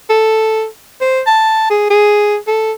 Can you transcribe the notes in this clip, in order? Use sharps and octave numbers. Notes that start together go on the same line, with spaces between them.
A4
C5
A5
G#4
G#4
A4